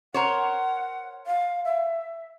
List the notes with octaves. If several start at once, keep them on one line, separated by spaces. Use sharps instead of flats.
A#4 C5 C#5 F#5
F5
E5